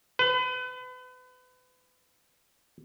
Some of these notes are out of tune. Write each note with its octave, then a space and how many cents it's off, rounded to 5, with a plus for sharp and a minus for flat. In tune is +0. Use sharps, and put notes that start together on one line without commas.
B4 +35